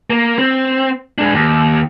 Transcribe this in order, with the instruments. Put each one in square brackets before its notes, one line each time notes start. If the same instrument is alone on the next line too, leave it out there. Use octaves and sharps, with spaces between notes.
[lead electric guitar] A#3
C4
G#3 D4
D#2